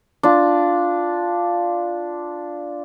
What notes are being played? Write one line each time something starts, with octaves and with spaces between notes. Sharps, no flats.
D4 F4